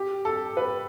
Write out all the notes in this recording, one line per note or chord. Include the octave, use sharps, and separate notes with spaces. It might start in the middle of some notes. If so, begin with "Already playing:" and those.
Already playing: G4
A4
B4